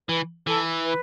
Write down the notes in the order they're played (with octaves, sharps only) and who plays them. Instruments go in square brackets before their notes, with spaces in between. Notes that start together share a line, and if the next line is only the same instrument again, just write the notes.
[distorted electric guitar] E3 [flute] B4
[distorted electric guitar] E3 [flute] A4
[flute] B4